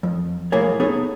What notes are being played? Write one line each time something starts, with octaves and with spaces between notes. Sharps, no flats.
F2
C2 F2 A2 A#3 G#4 C#5
B3 D#4 G#4 A4 C#5